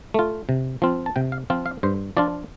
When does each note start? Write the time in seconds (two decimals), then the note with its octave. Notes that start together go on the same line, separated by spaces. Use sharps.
0.14 A3 F4
0.49 C3
0.82 F3 C4 F4
1.06 A5
1.16 C3 G5
1.32 F5
1.50 F3 C4 F4
1.66 F5
1.83 G2 C5
2.17 F3 D4 F4 D5